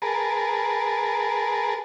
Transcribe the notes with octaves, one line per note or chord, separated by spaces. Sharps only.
G#4 A#4 B4 A5